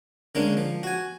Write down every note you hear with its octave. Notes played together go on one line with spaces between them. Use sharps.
D3 G#3 A#3 C#4 D4
F3
F#4 G#5